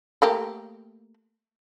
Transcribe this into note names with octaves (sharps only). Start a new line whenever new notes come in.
A3 A#3 G4